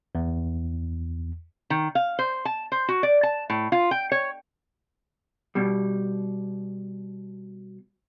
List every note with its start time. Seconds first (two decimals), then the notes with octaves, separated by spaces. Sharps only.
0.15 E2
1.70 D#3
1.95 F5
2.19 C5
2.45 A5
2.72 C5
2.88 F#4
3.03 D5
3.23 A5
3.50 A2
3.72 F4
3.91 G5
4.12 C#5
5.55 B2 G3